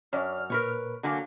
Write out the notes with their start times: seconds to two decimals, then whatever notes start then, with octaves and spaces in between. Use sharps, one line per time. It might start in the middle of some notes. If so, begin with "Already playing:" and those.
0.13 F#2 C#5 D5 F6
0.50 A#2 A#4 B4 C#5
1.03 D3 F#3 A#3 G#5